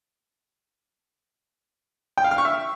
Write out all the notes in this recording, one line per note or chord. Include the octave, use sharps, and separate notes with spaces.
G5
F5
F6
C#6
E5